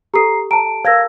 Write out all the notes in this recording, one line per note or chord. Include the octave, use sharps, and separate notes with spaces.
G4 A4 A#5 C7
A5 A#5 D7
A#4 C#5 F5 G#6 A#6